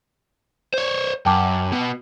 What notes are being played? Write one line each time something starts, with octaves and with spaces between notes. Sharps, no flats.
C5 C#5
F#2 G5 A5 D6
B2